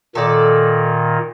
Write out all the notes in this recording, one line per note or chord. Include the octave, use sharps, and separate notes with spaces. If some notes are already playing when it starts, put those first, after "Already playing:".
A#2 D#3 A4 D5